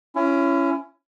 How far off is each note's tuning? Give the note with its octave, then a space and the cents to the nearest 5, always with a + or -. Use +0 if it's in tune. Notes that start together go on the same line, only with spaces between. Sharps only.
C#4 +0 E4 +35